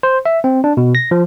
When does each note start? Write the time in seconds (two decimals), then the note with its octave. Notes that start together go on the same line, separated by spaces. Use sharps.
0.03 C5
0.26 E5
0.44 C4
0.64 D4
0.77 B2
0.95 A#6
1.11 F3